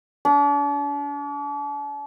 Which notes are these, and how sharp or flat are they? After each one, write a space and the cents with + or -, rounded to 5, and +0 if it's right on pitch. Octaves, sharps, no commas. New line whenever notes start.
D4 -40